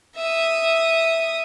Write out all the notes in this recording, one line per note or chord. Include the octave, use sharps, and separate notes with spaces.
E5 D#6